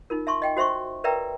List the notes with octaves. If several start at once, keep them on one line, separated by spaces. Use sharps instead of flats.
D#4 F4 A#4
E5 A5 C6 C#6
D#5 G5 G#5
F#4 C5 E5 C6 C#6
A#4 B4 D5 E5 G5 A#5